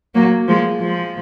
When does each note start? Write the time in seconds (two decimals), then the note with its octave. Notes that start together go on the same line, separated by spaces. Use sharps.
0.14 F#3 A#3
0.48 F3 G#3
0.81 F3 G#3